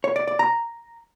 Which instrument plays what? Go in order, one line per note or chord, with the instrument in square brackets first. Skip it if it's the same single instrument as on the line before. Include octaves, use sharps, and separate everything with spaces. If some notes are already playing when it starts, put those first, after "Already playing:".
[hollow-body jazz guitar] C#5
D5
D5
A#5